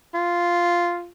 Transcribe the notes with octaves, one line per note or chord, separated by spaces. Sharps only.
F4